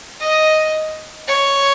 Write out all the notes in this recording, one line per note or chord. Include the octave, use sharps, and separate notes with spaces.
D#5
C#5